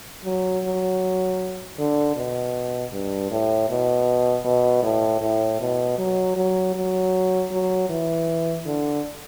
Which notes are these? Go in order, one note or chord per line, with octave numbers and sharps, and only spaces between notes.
F#3
F#3
D3
B2
G2
A2
B2
B2
A2
A2
B2
F#3
F#3
F#3
F#3
E3
D3